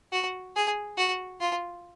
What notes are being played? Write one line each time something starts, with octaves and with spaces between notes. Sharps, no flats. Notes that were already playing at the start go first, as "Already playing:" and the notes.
F#4
G#4
F#4
F4